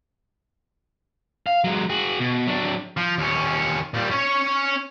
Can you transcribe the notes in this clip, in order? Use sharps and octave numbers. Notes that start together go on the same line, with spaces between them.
F5
F#3 G#3
F#4 G#4
B2
F#3 D4
F3
D#2 C#4
A#2 G3
C#4 C#5